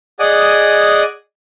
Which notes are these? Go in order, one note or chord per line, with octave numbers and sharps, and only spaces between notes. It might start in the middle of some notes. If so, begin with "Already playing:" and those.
G#4 D5 D#5 F#5 G#5